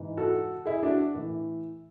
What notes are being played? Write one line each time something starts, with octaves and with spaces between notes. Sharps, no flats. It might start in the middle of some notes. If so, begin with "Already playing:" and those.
Already playing: G#2 E3
F#4 A4
E4 G#4
D4 F#4
A2 E3